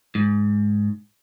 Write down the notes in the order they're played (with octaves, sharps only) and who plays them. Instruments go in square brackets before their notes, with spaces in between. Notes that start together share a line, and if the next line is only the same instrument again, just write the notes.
[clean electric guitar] G#2